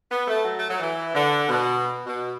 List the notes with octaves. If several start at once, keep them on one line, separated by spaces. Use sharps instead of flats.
B3
A3
F#3
A3
F#3
E3
D3
B2
B2